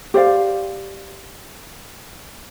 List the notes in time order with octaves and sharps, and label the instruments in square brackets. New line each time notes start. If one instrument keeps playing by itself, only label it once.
[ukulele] G4 C5 D5 F5